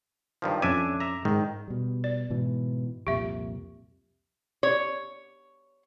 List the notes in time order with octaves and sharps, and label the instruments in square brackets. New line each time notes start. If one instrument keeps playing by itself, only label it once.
[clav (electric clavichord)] G2 D#3 F3
[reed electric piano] F2 C#4 D6 [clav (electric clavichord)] D4 E5 G#5
[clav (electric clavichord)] E5 A#5
[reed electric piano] G#2 [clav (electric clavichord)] D#3
[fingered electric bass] B2 G3
[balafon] D5
[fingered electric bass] G#2 B2 E3
[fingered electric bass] C2 F2 A#2 [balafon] G4 E5
[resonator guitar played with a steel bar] C#5